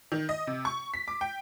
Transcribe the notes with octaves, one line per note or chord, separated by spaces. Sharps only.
D#3
D#5
C3
C#6
B6
D6
G5